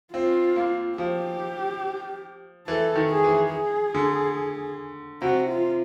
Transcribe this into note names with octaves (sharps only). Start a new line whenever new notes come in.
C4 F4
A#3
F3 G4
E3 A4
D#3
G#4
E3
G#4
D3
C3 F#4
F4